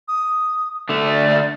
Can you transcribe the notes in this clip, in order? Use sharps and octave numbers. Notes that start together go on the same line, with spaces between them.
D#6
D3 A3
D5